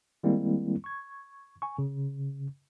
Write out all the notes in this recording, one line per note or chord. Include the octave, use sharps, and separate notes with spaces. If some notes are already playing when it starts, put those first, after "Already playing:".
D#3 G3 G#3 A#3 C4 E4
C#6 G#6
G#5 C#6
C#3